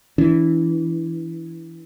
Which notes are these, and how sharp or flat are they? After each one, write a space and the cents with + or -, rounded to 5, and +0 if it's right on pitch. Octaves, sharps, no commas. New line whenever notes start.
E3 +0 D4 -45